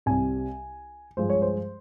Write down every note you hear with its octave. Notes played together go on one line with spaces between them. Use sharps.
C2 C3 G3 G#5
G2 F3 G#3 C5
C#5
C5